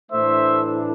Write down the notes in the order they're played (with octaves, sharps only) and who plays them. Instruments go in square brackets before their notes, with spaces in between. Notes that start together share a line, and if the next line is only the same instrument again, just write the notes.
[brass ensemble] A2 E3 A3 D4 C5 E5